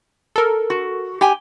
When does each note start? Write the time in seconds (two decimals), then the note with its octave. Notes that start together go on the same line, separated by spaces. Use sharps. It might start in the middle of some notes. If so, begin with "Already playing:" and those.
0.36 A4 A#4
0.70 F#4
1.21 G4 G5 G#5